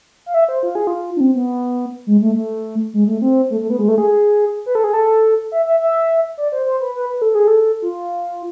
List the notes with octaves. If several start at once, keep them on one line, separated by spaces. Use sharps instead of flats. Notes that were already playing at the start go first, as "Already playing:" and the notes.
F5
E5
C5
F4
G#4
F4
D4
C4
B3
G#3
A3
A3
G#3
A3
C4
A3
A3
B3
G#3
A3
G#4
B4
A4
G#4
A4
E5
E5
E5
D5
C5
C5
B4
B4
B4
A4
G#4
A4
F4